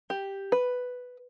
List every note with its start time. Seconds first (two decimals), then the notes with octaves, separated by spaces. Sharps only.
0.10 G4
0.52 B4